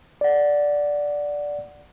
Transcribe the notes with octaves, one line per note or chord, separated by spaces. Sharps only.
D5 F#5